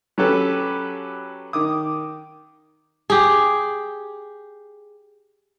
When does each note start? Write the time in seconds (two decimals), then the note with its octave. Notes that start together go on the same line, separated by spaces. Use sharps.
0.18 F#3 C#4 G4 A4 B4
1.53 D#3 D6 D#6
3.10 G4 G#4